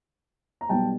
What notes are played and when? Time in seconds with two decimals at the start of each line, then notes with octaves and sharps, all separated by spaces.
0.61 A#5
0.69 B1 B2 G3 G5 A5